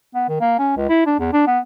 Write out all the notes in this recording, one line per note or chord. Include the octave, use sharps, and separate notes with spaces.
B3
D#3
A#3
C#4
C#2
E4
D4
E2
D4
B3